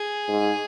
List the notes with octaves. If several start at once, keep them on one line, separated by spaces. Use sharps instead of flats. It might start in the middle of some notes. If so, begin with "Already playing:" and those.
Already playing: G#4
G#2